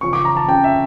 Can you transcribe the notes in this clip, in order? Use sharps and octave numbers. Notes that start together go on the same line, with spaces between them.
C#3 F3 C#4 C#6
D6
A#5
A5
C#3 F3 C#4 G5
E5